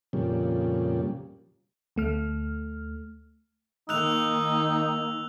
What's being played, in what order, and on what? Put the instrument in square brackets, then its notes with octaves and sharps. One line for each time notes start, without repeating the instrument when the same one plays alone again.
[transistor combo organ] F2 A#2 C#3 G3
[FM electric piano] D2 A3 F6
[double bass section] D#3 A#3 [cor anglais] D#4 [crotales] E6 F#6 F7